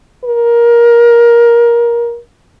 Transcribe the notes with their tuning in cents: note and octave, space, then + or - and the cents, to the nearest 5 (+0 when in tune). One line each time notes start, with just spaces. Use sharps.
A#4 +20